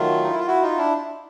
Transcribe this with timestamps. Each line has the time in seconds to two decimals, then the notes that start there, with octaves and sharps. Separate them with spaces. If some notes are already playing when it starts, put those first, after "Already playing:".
Already playing: D#3 F#3 A3 F4
0.24 D#4
0.32 E4
0.39 F4
0.47 E4 F#4
0.62 D#4 F4
0.77 D4 E4